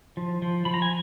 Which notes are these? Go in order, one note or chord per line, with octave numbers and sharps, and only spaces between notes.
F3
F3
F3 B5
A#5
G#5